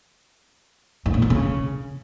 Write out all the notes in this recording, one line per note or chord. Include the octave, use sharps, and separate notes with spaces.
G#2
A#2
E2
C#3